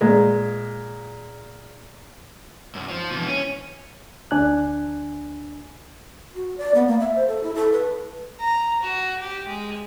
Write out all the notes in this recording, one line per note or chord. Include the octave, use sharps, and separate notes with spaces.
A#2 G#3
B1 F#2
F3
B2 E3
C#4
D2 D4 G#5 F#6
F#4
D5
B3
A#3
E5
C5
A4
E4
A4
B4
A#5
F#4
G4
G#3